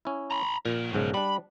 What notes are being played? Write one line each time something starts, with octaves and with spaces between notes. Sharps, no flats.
C#4 E4
A#5 B5
A#2 F3 A#4
B1 G#2 C#3
G3 D4 B5